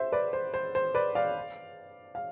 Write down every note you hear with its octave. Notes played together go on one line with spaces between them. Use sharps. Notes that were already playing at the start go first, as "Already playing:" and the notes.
Already playing: C5 E5
B4 D5
C5
C5
C5
B4 D5
D5 F5
F5